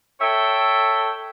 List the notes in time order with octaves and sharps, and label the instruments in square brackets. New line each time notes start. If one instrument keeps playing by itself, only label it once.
[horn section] A4 C#5 E5 G5